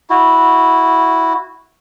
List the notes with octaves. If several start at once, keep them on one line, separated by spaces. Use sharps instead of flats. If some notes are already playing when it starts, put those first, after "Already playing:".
E4 F#4